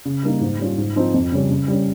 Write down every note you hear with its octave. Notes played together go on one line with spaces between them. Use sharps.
C#3
G3 A#3 D#4
G#2
G3 C#4 F4
G#2
F3 C4 D#4
F2
C#3 G3 C#4
C#3
G3 C#4